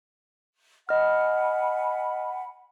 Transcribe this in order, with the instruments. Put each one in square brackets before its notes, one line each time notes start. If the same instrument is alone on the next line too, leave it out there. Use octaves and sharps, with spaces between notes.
[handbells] D#5 F6 [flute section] F#5 G#5 B5